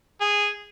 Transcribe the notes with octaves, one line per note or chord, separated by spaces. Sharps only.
G#4